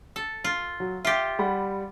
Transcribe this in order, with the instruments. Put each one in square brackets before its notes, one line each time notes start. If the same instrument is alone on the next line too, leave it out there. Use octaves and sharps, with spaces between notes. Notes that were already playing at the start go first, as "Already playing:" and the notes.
[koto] A4
F4
[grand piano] F#3
[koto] F4 G4 [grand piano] E5
[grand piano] G3 F#5 B5